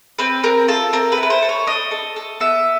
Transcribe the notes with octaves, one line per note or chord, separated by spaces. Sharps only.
C4 B4
C4 A#4
F4 A4
C4 A#4
B4
E4
B4
C5
A4
C#5
D4 D#5
A4
A4
B3 E5